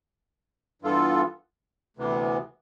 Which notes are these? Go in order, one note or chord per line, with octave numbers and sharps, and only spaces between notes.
G2 E3 B3 F4 A4
D2 C3 E3 B3